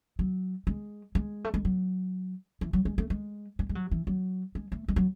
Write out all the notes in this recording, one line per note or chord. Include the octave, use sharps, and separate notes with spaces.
F#3
G#3
G#3
A3
G#3
F#3
E3
F#3
G#3
A3
G#3
G#3
G#3
F#3
E3
F#3
G#3
A3
G#3
F#3